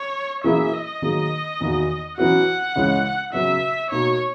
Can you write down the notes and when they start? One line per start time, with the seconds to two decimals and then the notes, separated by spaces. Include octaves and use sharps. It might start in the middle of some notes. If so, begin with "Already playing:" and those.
Already playing: C#5
0.44 F#2 E3 A#3 E4 G#4 E5
0.74 D#5
1.02 D#3 F#3 A#3 D#4 G#4
1.60 E2 D#3 A#3 D#4 F#4
2.17 F#2 E3 B3 F#4 F#5
2.76 C#2 C#3 E3 G#3 C#4
3.33 F#2 C#3 F#3 B3 F#4 E5
3.91 B2 A#3 D#4 C#5